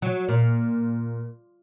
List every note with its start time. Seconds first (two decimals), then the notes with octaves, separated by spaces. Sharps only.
0.02 F#3
0.28 A#2